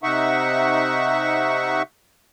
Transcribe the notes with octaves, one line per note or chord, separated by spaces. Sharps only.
C3 D#4 E5 F#5 C#6